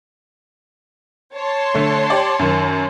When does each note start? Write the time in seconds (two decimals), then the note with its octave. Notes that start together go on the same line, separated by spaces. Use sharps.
1.35 C#5 A5 C6
1.74 D3 A3
2.10 G4 D5
2.39 F#2 D#3